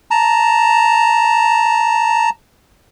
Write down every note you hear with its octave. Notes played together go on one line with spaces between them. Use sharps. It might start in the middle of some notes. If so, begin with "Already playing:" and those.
A5 A#5